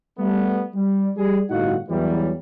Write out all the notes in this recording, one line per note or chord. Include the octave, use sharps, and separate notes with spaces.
G3 A3 B3
G3
G3 G#4
G1 A2 D#4 F#4 F5 F#5
E2 E3 F#3 G3